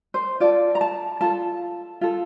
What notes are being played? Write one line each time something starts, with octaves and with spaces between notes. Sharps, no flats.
C5
F4 A4 D5
A#5
A5
F4 A4 A5
F4 A4